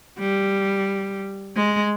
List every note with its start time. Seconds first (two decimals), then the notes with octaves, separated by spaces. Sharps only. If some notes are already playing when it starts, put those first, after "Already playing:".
0.19 G3
1.56 G#3